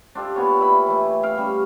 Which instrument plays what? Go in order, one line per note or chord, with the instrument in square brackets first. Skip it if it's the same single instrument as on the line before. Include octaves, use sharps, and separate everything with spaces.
[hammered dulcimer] D4 F4 G4 A4
A#2 B3 C#5
A#2 E4 B5
E3 A3
F5 G5
G3 C#4